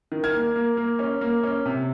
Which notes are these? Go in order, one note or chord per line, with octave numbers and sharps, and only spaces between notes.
D#3
F6 G#6
A#3
A#3
A#3
C#4
A#3
C#4
C3